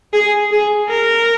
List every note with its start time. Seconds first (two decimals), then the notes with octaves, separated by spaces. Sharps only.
0.13 G#4
0.51 G#4
0.89 A#4